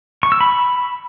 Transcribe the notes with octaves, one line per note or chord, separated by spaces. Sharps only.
C#6
E6
B5